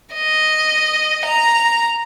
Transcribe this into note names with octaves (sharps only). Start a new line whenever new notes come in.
D#5
A#5